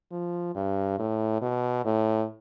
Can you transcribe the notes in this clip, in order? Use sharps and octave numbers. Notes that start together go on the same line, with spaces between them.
F3
G2
A2
B2
A2